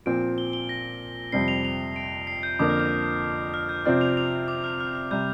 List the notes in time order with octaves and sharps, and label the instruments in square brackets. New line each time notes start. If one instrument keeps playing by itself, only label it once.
[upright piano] A#2 F3 C4 [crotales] D7
[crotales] G7
G7
A#6
[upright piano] F2 C3 G3 C4 [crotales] C7
[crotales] F7
F7
D7
C7
G6
[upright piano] F2 D3 F3 A#3 [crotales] D6
[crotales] F6
G6
F6
G6
[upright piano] C3 F3 C4 F4 D5 [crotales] F6
[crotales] F7
F7
D6
F6
F6
F6
[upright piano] C3 G3 [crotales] G6